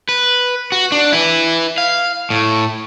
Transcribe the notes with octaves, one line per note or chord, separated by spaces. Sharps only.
B4
F#4
D4
E4 B4
F5
A2